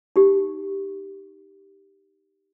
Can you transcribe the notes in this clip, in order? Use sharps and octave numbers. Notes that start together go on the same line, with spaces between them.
D#4 G4